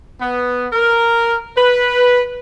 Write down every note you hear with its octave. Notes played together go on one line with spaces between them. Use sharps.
B3
A#4
B4